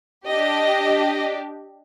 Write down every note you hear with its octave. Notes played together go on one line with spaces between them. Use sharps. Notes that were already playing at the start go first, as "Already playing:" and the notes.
D4 G4 D#5